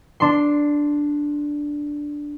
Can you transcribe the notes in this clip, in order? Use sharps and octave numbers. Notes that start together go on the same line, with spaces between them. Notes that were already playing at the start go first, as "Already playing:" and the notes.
D4 C6